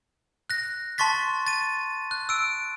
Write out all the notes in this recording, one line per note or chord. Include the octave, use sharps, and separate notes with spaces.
F#6 A#6
A5 C6 C#6 A6 B6
A6 D#7
F#6
E6 D7